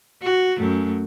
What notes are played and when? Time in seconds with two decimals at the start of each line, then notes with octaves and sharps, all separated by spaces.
0.22 F#4
0.58 F#2 A3